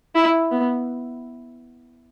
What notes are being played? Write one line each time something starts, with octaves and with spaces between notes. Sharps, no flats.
E4
B3